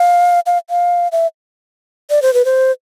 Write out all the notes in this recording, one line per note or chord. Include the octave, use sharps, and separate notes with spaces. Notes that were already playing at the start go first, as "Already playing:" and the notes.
Already playing: F5
F5
F5
E5
D5
C5
B4
C5